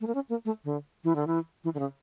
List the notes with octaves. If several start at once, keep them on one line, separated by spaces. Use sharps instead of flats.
A3
A#3
C#4
A#3
A3
D3
E3
D3
E3
E3
D3
C#3